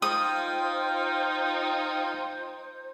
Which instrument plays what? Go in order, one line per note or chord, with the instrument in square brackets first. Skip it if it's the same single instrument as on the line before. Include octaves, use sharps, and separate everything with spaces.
[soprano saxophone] D#4 [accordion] F4 G5 [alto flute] C5 [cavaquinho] D#6